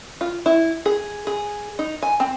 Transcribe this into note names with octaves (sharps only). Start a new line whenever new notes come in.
F4
E4
G#4
G#4
D#4
G#5
C4